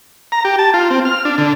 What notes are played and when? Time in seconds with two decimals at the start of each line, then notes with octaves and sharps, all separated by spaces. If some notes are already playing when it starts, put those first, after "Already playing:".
0.32 A#5
0.45 G4
0.59 A5
0.74 F4
0.90 C4
1.05 F6
1.25 D4
1.38 D3